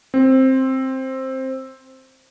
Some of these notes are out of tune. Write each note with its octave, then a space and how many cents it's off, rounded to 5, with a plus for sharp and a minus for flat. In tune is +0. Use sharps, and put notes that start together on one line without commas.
C4 +10